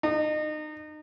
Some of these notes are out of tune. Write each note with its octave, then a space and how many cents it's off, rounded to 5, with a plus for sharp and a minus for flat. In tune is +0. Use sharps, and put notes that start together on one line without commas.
D#4 -30